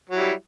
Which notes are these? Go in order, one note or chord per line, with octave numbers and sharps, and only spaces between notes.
F#3 G3 E4